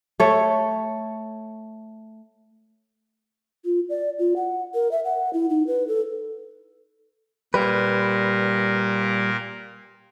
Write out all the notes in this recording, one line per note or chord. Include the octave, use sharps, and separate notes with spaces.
A3 C#5
F4
D5
F4
F#5
A#4
E5
F#5
E4
D#4
B4
A4
A#2 G3 A#4 B4